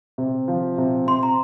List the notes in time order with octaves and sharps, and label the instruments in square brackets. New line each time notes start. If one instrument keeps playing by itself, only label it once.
[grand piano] C3
F3
C3
[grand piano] C3 [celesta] C6
[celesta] A#5